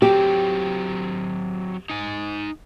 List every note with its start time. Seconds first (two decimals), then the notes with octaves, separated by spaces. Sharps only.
0.02 F#3 C4 G4
1.90 D#4 G#5